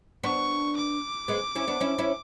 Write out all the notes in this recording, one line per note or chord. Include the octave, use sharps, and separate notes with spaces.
B3 D4 C#6
D6
G#3 B3
C#4 E4
B3 D4
C#4 E4
C#4 E4